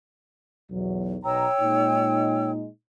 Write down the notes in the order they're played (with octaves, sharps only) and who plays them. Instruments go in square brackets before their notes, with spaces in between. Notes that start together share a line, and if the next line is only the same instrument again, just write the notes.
[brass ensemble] B1 E2 F#3
[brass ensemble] B1 B2 A#5 [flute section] C#5 G5 E6
[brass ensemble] A#2 G#3 D#4